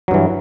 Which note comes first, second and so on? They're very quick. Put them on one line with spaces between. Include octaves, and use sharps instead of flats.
F#3 G2 E3